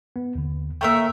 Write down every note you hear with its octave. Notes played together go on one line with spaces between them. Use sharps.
B3
D#2 D3
A3 A#3 A#4 C#5 E5 G5